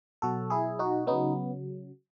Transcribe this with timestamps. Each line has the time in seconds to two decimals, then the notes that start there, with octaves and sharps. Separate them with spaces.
0.22 B2 F#3 F#4 A4
0.50 E4 G#4
0.79 D#4 F#4
1.07 C#3 F#3 B3 D#4